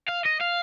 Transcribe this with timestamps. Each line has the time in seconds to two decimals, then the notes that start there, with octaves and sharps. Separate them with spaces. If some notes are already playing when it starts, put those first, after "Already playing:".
0.09 F5
0.26 D#5
0.41 F5